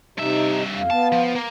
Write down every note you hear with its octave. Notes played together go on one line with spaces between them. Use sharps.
G2 C3 D#4 E5
F2 F5
B3 A5
F3
A#3